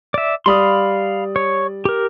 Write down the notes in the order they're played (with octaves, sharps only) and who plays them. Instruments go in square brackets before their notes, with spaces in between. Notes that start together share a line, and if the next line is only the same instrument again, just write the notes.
[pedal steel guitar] D5 E5
[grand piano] G3 D5 D#6 [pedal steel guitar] F5 B5 C6
[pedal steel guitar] C#5
G4 A#4